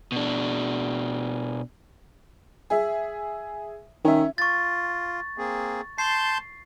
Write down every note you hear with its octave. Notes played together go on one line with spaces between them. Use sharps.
B2 D4
G#4 E5
D#3 C#4 E5
F4 C#6 A6
A#3 C4 G#4
A5 C6 G6 C7